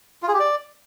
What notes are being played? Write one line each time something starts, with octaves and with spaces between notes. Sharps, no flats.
F4
G#4
G4
D5